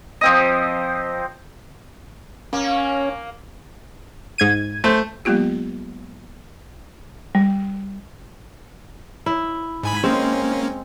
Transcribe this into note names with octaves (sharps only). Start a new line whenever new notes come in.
F3 C4 D#5
A#3 C#4
G#2 G#6 D#7
A3 C5
F#3 G#3 A#3 B3 F4 G4
G3
E4
G#2 G#5 B5
G#3 A#3 C4 C#4